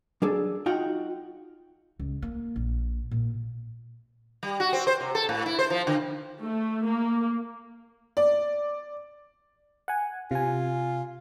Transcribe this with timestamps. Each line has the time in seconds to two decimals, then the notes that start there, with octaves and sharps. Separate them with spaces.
0.22 F#3 D4 G#4 A4
0.66 D#4 F4 F#4 F#5 G5
1.99 C#2
2.22 A#3
2.56 A#1
3.11 A#2
4.43 G3
4.60 F#4
4.73 C4
4.87 C5
5.01 C3
5.15 A4
5.29 A2
5.46 E4
5.59 C5
5.70 F3
5.87 D3
6.41 A3
6.87 A#3
8.17 D5
9.88 F#5 G#5
10.31 C3 F4 G#5